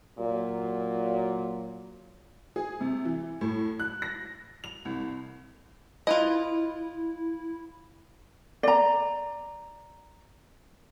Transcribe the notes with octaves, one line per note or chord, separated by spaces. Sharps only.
A#2 F#3
G#4
C3
E3
A2
F#6
A#6
F7
C2
E4 F4 B4 D#5
D5 A#5